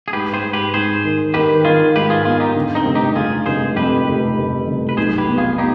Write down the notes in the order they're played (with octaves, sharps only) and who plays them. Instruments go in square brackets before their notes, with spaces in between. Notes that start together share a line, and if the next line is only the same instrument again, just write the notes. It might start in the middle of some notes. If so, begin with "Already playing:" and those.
[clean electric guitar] G#4
[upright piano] G#2 [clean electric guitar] G4 B4
[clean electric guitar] G#4 C5
[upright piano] G#2
[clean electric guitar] G4 B4
[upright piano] G#2 [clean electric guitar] G#4 C5
[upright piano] D#3
[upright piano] D#3 [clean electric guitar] G4 B4
[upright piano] D#3 [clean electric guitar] F4 G#4
[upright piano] G#2 [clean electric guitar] G4 B4
[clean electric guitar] F4 G#4
[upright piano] B3 [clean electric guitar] F4 G#4
[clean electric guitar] D#4 G4
[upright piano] D3
[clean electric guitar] C4 D#4
[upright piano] F1
[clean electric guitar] D#4 G4
[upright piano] F1 [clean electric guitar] F4 G#4
[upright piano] F1 [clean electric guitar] G#4 C5
[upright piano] F2 [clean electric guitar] G4 B4
[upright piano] F1
F1
F1
[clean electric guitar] B4
[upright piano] B1 [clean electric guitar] G#4 C5
[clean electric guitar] G4 B4
[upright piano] B3
[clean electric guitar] F4 G#4
[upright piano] B3 [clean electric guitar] D#4 G4